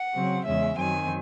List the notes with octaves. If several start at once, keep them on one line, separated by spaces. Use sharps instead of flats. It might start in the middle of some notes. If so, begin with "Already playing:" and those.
Already playing: F#5
C#3 F#3 C4
E2 C#3 G#3 C#4 E5
F#2 D#3 F#3 C4 G#5